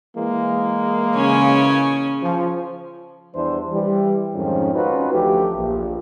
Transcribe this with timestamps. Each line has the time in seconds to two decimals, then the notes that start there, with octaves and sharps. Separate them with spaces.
0.15 E3 G#3 A#3
1.14 C#3 C#4 G#5
2.21 F3
3.35 E2 E3 G3 D4 E4 C5
3.72 E3 G3
4.35 F2 G#2 D#3 F3 C4 C#4
4.74 C#4 D#4 F4 F#4 B4
5.13 D2 E3 F3 A3 G4
5.56 A#1